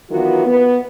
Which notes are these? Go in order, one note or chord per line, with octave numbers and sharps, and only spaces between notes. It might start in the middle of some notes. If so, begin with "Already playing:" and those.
D#3 E3 F#3 B3 F4 F#4
B3